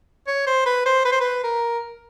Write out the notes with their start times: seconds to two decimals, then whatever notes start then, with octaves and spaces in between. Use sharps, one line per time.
0.27 C#5
0.47 C5
0.66 B4
0.86 C5
1.05 B4
1.12 C5
1.21 B4
1.44 A#4